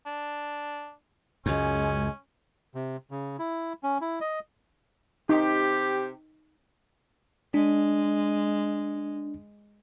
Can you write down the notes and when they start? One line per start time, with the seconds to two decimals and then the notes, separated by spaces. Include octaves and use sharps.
0.06 D4
1.46 C#2 F#2 G#3 C#4
2.75 C3
3.11 C#3
3.39 E4
3.83 C#4
4.01 E4
4.21 D#5
5.29 C3 D#4 G4
7.54 G#3 D4